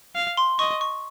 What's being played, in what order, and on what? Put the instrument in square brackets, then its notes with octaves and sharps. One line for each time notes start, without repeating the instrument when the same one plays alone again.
[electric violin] F5
[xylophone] C6
[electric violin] D#5 [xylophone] C#6
[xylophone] C#6